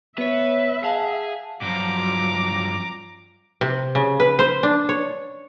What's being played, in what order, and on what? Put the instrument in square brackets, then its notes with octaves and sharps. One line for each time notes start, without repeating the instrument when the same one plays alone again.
[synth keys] B3 C#5 [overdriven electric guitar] B4 [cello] E5
[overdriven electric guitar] G#4 [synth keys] F5 F#5 A5
[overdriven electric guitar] G2 F3 [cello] F#3 [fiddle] A#5 D6
[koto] C3
C#3
B4
C5
D4
C#5